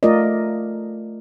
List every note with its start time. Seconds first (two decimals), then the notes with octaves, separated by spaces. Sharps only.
0.03 A3 F4 A#4 D5 D#5